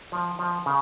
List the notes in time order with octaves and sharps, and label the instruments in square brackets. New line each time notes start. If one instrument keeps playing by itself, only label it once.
[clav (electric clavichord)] F3
F3
C#3